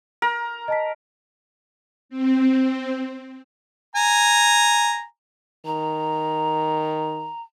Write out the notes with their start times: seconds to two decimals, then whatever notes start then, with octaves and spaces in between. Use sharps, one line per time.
0.22 A#4
0.68 D#5 A5 B6
2.09 C4
3.96 G#5 A#5
5.66 D#3 A#5